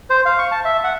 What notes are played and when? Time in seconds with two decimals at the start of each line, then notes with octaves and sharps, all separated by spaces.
0.10 C5
0.25 F5
0.39 C#6
0.52 A5
0.65 E5
0.84 F#5